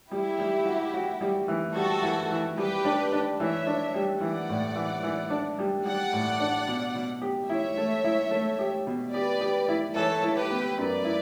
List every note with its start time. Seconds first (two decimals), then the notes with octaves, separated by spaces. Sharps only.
0.11 G3 E4 G4
0.39 G3
0.66 F#4
0.94 F#4
1.21 G3
1.48 E3
1.75 G3 F#4 A4
2.02 E3
2.31 E3
2.57 G3 G4 B4
2.85 D4
3.13 D4
3.39 E3 C#5 E5
3.67 D4
3.94 G3
4.21 E3 D5 F#5
4.49 A2
4.76 E3
5.03 E3
5.30 D4
5.59 G3
5.86 G3 D5 F#5
6.13 A2
6.40 D4
6.67 B2
6.95 B2
7.22 G4
7.49 E4 C#5 E5
7.77 A3
8.04 E4
8.31 A3
8.59 G4
8.87 B2
9.13 G4 B4 D5
9.41 G4
9.69 E4
9.95 E3 A4 C#5
10.23 E4
10.36 G4 B4
10.50 B3
10.77 F#2 B4 D5
11.04 E4